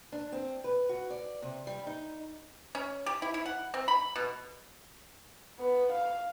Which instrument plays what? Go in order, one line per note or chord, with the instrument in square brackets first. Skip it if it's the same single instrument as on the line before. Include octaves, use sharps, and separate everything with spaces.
[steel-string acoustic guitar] D4
C4
B4
F#4
D5
C3
G3
D#4
[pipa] C#4
G4
E4
E4
F#5
C4
B5
B2
[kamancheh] B3
F5